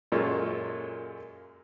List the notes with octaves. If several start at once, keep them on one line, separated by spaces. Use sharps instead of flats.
F#2 A#2 G#3 F4 A4 C#5